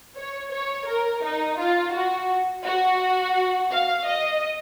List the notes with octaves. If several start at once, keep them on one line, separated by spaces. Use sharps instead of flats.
C#5
C#5
A#4
D#4
F4
F#4
F#4
F5
D#5